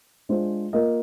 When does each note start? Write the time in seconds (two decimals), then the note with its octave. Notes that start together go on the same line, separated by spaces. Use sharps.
0.29 G#3 D4 F4 C5
0.73 A#3 F4 A#4 D#5